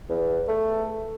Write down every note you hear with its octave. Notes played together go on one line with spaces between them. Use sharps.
E2
A3